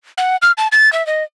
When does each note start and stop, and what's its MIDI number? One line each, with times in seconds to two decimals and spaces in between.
0.18 0.36 78
0.42 0.52 89
0.58 0.68 81
0.72 0.92 93
0.93 1.05 76
1.07 1.23 75